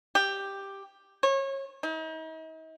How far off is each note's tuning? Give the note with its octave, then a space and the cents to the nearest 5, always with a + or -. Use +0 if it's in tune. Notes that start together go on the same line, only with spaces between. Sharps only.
G4 +5
C#5 -30
D#4 +40